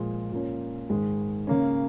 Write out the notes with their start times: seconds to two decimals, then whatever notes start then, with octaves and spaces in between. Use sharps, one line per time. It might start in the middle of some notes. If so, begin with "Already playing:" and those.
Already playing: A#2 F3 G#3
0.32 A#2 A#3 C#4
0.89 G#2 D#3 G#3
1.47 C#3 A#3 C#4